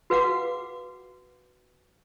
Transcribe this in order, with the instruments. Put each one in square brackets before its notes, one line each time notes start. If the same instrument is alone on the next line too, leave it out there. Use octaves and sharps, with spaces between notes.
[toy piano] F#4 B4 F5 F#5 D6